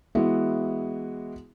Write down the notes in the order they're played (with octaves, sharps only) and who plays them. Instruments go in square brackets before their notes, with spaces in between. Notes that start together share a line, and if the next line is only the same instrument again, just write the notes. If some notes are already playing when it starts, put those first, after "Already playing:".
[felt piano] E3 G#3 B3 E4 F#4